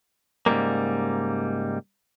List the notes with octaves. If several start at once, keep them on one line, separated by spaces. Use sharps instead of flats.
G#2 C#3 G3 G#3 A#3